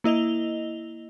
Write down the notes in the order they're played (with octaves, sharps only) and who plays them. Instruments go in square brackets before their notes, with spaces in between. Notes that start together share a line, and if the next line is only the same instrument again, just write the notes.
[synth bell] A#3 E4 D#5 F7 G7